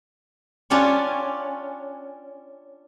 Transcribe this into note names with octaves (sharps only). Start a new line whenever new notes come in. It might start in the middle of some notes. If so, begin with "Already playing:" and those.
C#4 D4 F4 G4 C#5